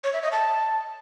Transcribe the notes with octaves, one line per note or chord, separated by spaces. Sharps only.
C#5
E5
D#5
A5